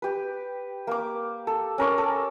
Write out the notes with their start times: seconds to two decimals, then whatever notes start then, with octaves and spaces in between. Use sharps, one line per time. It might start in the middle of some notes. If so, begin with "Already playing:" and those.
0.02 G4 B4
0.87 A#3 D6
1.47 A4
1.78 C#4 A#4 C#6 D6
1.98 A4